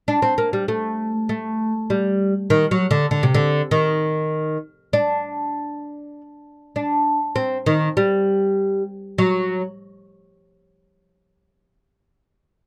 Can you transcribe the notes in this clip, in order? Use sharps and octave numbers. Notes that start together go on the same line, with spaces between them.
D4
C4
A#3
G3
A3
A3
G3
D#3
F#3
D3
D3
C3
D3
D#3
D4
D4
C4
D#3
G3
F#3